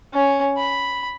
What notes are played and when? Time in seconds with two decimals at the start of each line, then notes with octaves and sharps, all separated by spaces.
0.14 C#4
0.58 B5